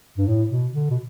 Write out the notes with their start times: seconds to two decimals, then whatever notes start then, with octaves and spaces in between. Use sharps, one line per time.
0.18 G2
0.28 A2
0.50 B2
0.73 D3
0.90 B2